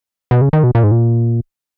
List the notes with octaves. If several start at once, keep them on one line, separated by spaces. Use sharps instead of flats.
B2
C#3
D#3
B2
A#2
G#2
A#2